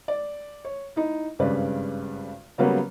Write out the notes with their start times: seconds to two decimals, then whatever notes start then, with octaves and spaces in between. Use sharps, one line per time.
0.08 D5
0.65 C#5
0.96 D#4 E4
1.39 G#1 G2 C#3 B4 D5
2.58 C#3 F#3 G3 A#3 B3